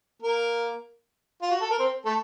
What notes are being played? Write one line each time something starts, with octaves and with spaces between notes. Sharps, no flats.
A#3 A#4
F4
F#4
A4
A#4
C4 C5
A3 A4